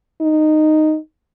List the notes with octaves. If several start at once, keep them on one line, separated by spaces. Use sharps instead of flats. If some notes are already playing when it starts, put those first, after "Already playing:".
D#4